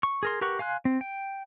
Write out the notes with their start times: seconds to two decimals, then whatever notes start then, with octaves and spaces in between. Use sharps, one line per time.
0.03 C#6
0.23 G#4 A#4 C6
0.41 G4 A#4 B4 F#5 C#6
0.59 F5 G#5 C6 F#6
0.85 C4
1.01 G5